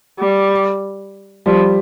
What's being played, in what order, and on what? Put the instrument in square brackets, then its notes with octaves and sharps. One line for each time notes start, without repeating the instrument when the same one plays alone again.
[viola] G3
[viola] F3 [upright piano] G3